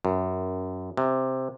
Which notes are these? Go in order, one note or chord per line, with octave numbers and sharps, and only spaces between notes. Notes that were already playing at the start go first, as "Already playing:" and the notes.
F#2
C3